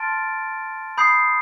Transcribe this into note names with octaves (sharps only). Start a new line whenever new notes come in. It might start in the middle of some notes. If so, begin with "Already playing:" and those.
Already playing: A5 C6 F6 A6 D7
B5 D#6 G6 C7